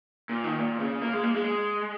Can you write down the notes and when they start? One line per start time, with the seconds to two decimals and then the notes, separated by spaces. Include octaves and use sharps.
0.29 A#2
0.44 D#3
0.59 A#2
0.80 C#3
1.02 A#3
1.13 G#3
1.24 A#3
1.35 G#3
1.45 G#3